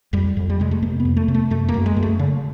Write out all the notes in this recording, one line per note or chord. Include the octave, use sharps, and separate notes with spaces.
F2 G3
F2
G3
C3 G#3
A3
C3 A#3
B3
F2
A3
C3
A3
F#2 A3
A#3
F#2
G#3
F#2
A3
C#3